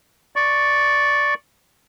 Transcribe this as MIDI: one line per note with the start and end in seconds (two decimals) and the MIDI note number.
0.36 1.34 74
0.36 1.34 85